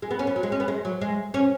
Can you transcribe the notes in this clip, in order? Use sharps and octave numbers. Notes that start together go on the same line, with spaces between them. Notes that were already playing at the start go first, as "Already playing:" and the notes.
G#3
B3
C#4
B3
F#3
G#3
C#4
B3
G#3
F#3
G#3
C#4